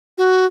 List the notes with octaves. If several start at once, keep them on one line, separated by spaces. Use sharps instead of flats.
F#4